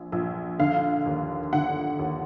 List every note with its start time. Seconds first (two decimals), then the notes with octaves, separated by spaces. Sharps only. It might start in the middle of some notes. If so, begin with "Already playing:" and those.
Already playing: A#1
0.12 A#1
0.59 D3 F5
1.06 D#2
1.53 D3 F#5
1.99 D#2